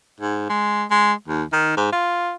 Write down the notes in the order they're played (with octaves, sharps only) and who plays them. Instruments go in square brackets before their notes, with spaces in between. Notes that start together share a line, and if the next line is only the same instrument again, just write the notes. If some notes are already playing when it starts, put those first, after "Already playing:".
[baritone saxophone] G#2
G#3
G#3
D#2
D#3
G#2
F4